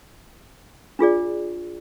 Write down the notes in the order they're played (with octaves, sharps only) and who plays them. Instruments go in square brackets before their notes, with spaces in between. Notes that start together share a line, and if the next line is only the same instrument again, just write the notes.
[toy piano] D4 F4 G#4 D5